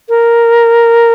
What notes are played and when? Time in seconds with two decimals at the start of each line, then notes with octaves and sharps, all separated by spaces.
0.09 A#4